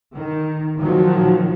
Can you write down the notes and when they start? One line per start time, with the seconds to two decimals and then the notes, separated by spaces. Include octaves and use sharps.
0.15 D#3
0.79 A#2 D#3 F3 F#3